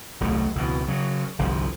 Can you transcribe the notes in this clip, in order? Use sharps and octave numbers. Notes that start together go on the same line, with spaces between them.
D#1 C2 F#3 A3
C#2 B2 E3
C#3 F#3
G1 C2 F3